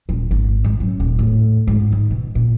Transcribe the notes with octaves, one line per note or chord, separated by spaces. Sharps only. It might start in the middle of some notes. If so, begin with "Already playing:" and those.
D#1
G#1
G#2
F#2
D#1
A2
G#2
D#3
B2
A#2